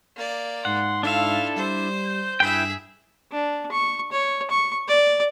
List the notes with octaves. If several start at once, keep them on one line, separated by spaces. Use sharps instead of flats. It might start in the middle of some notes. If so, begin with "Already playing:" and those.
A#3 D5
G#2 F#5 C6
D4 E4 F4 A4 E5 F5
G3 C5
G6
G2 E4 G#4 B4 E5 G5
D4
C#6
C#5
C#6
D5